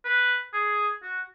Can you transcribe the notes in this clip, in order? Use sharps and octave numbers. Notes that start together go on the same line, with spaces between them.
B4
G#4
F#4